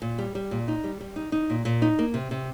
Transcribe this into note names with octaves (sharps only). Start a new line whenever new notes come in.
A#2
G3
G3
A#2
D#4
G3
G3
D#4
D#4
A#2
A#2
D#4
A#3
C3
C3